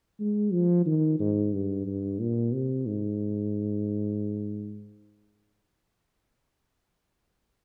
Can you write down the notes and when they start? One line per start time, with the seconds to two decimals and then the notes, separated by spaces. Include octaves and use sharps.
0.20 G#3
0.53 F3
0.86 D#3
1.20 G#2
1.53 G2
1.86 G2
2.20 A#2
2.53 C3
2.87 G#2